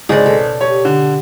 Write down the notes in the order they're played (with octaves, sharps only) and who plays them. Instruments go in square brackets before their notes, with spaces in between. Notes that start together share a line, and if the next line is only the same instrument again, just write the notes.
[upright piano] G#1 [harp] C#3 [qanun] G#3 D5
[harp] B2 [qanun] A4
[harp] G4 D#5 [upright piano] C#5
[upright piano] D3